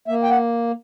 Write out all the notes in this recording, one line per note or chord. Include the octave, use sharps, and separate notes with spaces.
A#3 E5
G5
F#5